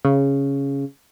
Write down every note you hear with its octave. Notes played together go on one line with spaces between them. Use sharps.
C#3